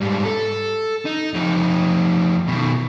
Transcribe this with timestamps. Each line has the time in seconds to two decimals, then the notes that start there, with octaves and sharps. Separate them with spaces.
0.01 G#2 G3
0.25 A4
1.05 D#4
1.34 F2 D#4
2.48 B2 D#3